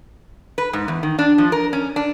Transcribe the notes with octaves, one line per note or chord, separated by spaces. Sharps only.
B4
G#2
E2
D#3
D4
F3
A#4
C#4
D4